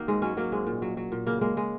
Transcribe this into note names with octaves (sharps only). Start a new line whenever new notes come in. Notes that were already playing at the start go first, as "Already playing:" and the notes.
Already playing: D#3 A#3 D#4 F#4
G#2 G#3
F#3 C#4
F#3 A#3
G#2 G#3
A#2
F#3
F#3
A#2
C#3 A#3
G#3 A#3
G#3